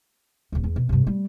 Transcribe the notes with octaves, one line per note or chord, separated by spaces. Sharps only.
D1 D2
E2
B2
G2 C3
G3 A3